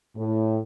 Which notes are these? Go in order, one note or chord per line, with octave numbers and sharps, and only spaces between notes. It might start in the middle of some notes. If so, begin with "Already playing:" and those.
A2